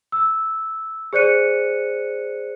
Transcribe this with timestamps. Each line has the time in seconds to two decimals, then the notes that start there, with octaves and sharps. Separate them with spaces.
0.12 E6
1.13 G#4 C5 D5 F#6 C#7 D#7